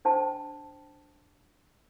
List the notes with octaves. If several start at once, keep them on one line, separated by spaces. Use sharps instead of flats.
D4 C5 G5 A5